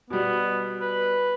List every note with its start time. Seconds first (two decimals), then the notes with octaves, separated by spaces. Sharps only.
0.10 B2 G3 B3
0.81 B4